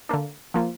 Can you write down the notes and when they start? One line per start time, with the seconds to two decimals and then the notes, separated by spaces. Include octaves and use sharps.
0.09 D3 A#3 D4
0.54 F3 A#3 F4